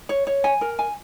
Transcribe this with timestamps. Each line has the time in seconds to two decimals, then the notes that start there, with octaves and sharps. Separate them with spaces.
0.09 C#5
0.27 C#5
0.44 G#5
0.61 A#4
0.79 G#5